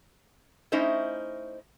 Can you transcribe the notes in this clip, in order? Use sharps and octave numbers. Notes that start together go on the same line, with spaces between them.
A3 C#4 D#4 E4 C5 D#5